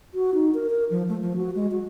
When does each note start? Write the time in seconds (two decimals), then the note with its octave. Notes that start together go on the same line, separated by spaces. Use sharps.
0.14 F#4
0.34 D#4
0.54 A#4
0.70 A#4
0.90 F3
1.09 A3
1.21 F3
1.36 F#4
1.55 G#3
1.71 F#4